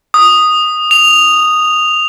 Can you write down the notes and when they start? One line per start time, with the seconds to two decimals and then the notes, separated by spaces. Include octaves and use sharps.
0.14 D#6
0.91 F7